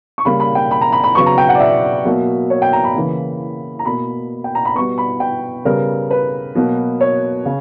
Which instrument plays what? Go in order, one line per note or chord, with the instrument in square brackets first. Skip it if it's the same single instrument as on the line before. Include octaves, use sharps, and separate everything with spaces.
[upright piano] C#6
C#3 G3 A#3 B5
B5
G5
B5
A#5
B5
B5
C#3 F#3 B3 C#6
A#5
G5
F#5
D5
E5
B2 F#3 A#3
C#5
G5
A#5
B5
C#3 E3 A#3
A#5
B2 A#3 B5
G5
A#5
B5
B2 G3 B3 C#6
B5
G5
C#3 G3 B3 A#4
B4
B2 F#3 A#3
C#5
C#3